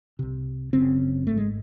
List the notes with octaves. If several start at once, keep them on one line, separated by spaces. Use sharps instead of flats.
C2 C3
F#1 F#2 C#3 C4
G#1 G#2 A3
G#3